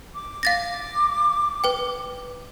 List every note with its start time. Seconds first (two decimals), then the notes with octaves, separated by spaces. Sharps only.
0.14 D6
0.43 F5 A6 A#6
1.64 B4 G5